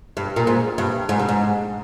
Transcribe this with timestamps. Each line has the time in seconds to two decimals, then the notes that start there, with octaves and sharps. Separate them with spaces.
0.17 G2
0.36 A#2
0.47 G#2
0.78 G2
1.09 G#2
1.19 G2
1.29 G#2